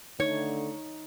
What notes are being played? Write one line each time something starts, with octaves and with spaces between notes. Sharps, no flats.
D3 A3 D#4 C#5